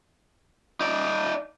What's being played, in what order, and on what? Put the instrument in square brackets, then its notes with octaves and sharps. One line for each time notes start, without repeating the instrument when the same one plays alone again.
[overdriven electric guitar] D#4 D5